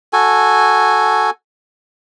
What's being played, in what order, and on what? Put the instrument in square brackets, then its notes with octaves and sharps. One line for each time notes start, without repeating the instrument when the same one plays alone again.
[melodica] F#4 A4 G#5